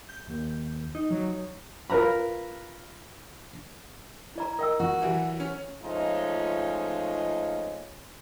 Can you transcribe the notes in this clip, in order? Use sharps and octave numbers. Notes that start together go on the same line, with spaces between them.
G6
D#2
D#4
F#3
F4 A#4 B4 A#5 B5
E4 D5 A#5
A#4 D#5 G5 E6
F#4
E3 F#3 G3
C#4
F3 G#3 A3 C#4 D#4 F4